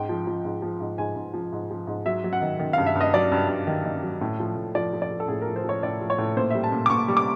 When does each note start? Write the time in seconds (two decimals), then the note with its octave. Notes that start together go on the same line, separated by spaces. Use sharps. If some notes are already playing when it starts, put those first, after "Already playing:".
Already playing: G#2 G5
0.09 F3
0.27 F3
0.45 G#2
0.62 F3
0.81 G#2
0.98 G#2 G#5
1.16 G#2
1.34 F3
1.53 G#2
1.71 F3
1.87 G#2
2.06 F#3 E5
2.24 F#3
2.33 F#5
2.42 D#3
2.59 D#3
2.73 G2 F5
2.86 E5
2.95 G2
3.01 D#5
3.14 F#3 D5
3.32 G2
3.49 G2
3.67 D#3
3.85 D#3
4.03 F#3
4.21 A2
4.40 F3
4.56 A2
4.75 F3 D5
4.93 F3
5.02 D5
5.11 F3
5.20 A4
5.28 A2 G#4
5.42 A#4
5.47 F3
5.56 C5
5.64 F3 C#5
5.83 A2 D5
6.01 F3
6.10 C#5
6.18 A2
6.37 A#2 C5
6.50 G3 E5
6.64 A5
6.72 A#2
6.86 D6
6.90 A#2 C#6
7.08 G3
7.17 D6